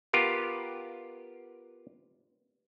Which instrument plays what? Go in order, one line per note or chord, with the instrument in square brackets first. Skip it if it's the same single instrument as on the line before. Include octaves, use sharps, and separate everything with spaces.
[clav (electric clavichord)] B3 F4 G4 A#4